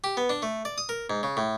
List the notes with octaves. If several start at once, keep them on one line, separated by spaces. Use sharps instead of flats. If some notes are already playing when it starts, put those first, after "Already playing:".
G4
B3
D4
A3
D5
D#6
A#4
G#2
C#3
A2